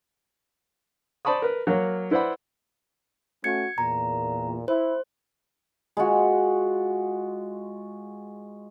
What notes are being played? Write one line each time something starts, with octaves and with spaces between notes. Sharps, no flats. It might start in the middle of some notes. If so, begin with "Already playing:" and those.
C5 D5 A5 B5 C#6 D#6
A#4 B4
F#3 A#3 A#4 C#5
E4 B4 C5 D5 F#5 B5
A3 C#4 F#4 G#6 C#7
E2 A#2 A#5
E4 C5
G#3 F4 F#4